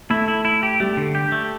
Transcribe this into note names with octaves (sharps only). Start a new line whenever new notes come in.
A3 E4
E4
E4
G4
G3 A3
D3
G4
A3